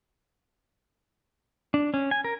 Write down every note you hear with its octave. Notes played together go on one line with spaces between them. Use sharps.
D4
C#4
G#5
A#4